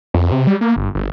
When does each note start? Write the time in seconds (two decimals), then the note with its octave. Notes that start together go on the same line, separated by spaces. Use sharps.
0.14 F2
0.32 C3
0.47 G3
0.61 A#3
0.76 G1
0.95 G1